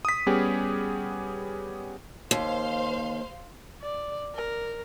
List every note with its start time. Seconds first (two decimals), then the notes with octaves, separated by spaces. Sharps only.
0.05 D#6 B6
0.26 G3 B3 C#4 G4 G#4
2.31 D#2 C5 F5 C6
3.82 D5
4.35 A#4